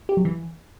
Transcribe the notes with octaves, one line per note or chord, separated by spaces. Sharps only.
G4
F#3
E3